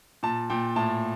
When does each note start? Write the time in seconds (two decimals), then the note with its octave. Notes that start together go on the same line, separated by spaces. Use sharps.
0.23 A#2 A5
0.50 A#2 G5
0.76 A2 A5